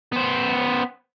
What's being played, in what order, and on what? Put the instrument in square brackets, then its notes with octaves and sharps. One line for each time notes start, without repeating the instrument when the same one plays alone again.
[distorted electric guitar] B3 C5